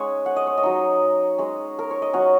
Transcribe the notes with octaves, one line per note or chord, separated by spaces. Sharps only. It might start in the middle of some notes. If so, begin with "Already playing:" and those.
Already playing: G#3 C#4 D#4 C#5 F#5 G#5
F#5
D#5
C#5
D#5
F#3 D#4
G#3 C#4
A#4
C#5
D#5
F#3 C#4 F#5